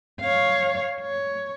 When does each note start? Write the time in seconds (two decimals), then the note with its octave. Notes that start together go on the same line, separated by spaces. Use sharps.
0.20 C#5 F5
1.01 C#5